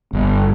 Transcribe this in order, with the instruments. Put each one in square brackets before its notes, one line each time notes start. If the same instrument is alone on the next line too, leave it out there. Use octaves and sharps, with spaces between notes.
[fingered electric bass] G1